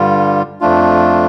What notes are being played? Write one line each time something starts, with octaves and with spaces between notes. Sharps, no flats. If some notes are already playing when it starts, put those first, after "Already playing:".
Already playing: G2 D3 G3 F4
F2 F3 A3 D4 F4